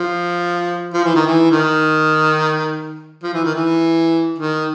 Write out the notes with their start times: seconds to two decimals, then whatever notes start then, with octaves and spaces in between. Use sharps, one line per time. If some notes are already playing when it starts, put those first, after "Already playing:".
Already playing: F3
0.94 F3
1.04 E3
1.15 D#3
1.26 E3
1.51 D#3
3.23 F3
3.34 E3
3.44 D#3
3.55 E3
4.38 D#3